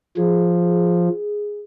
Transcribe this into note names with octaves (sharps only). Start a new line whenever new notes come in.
F3 G#4